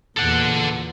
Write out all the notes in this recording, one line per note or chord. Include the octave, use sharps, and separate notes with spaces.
E2 A#2 A4 F#5